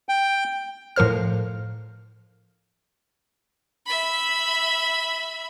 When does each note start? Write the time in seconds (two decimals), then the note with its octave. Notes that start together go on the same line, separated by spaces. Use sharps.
0.09 G5
0.96 A2 F3 A#4 C5 F6
3.86 E5 B5